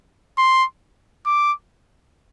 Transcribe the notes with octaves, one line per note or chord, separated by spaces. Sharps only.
C6
D6